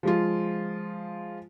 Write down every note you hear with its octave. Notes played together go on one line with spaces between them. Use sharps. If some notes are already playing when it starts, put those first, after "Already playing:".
F3 G#3 F4